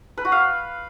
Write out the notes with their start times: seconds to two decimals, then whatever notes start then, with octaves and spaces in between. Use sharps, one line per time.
0.18 B4
0.25 F#4
0.32 F5